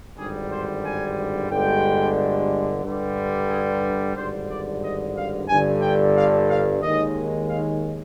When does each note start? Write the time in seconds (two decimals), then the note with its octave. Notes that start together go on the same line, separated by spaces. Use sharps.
0.17 G#1 G2 D3 G3 G#4
0.50 C5
0.84 G#5
1.50 G1 G2 D3 G#3 G5
2.83 G2 D3 G3
3.49 G#4
4.16 G#1 G2 D3 C5
4.49 D5
4.82 D#5
5.15 F5
5.48 G1 G2 D3 G#5
5.81 G5
6.15 F5
6.48 F5
6.81 D#2 D#3 G#3 D#5
7.48 F5